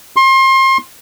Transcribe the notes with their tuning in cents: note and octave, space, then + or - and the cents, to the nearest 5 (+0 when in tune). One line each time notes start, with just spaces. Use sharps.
C6 +30